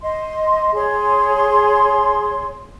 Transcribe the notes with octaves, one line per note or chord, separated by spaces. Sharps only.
D#5 C6
G#4 C#5 C6